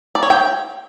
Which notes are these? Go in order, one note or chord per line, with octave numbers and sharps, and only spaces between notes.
D5
C#5
G5